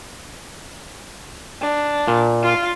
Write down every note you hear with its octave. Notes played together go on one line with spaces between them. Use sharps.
D4
A#2
F4